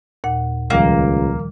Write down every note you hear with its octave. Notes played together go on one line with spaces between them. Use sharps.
D#2 A#2 F#5
C#2 D#3 F3 G3 A#3